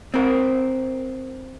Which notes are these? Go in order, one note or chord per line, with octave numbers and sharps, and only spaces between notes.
C4 A#4